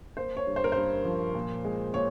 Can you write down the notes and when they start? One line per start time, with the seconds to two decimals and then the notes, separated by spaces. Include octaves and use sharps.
0.17 A#3 C5
0.37 C#5
0.47 G2
0.56 C5
0.64 A#4
0.72 G2 C5
1.05 F3
1.35 A#2
1.65 G#3
1.93 A#2 C#5